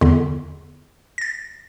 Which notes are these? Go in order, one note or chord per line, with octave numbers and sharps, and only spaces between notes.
E2 D3
A6 A#6